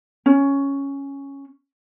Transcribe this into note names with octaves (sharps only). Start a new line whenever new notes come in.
C#4